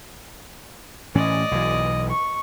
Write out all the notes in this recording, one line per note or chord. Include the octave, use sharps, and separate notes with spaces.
A2 E3 C#4 D5 D#5
B1 E3
C#6